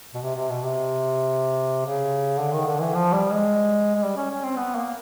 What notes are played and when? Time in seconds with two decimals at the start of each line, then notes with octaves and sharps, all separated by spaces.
0.14 B2
0.22 C3
0.36 C3
0.49 B2
0.62 C3
1.85 C#3
2.39 D3
2.53 D#3
2.67 D3
2.81 E3
2.94 F3
3.12 G3
3.30 G#3
3.95 G#3
4.03 G3
4.16 C#4
4.30 C#4
4.44 C4
4.57 B3
4.75 A#3